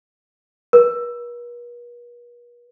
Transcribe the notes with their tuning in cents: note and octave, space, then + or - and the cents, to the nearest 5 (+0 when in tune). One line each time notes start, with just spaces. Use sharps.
B4 -45